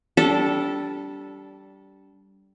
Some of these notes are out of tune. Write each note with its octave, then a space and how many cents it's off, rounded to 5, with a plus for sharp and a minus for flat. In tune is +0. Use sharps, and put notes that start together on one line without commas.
G3 -15 D4 -30 A4 +0